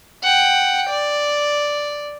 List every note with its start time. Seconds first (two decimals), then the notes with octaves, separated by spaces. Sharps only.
0.24 F#5 G5
0.90 D5